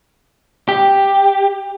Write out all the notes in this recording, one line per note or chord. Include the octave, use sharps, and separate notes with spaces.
G4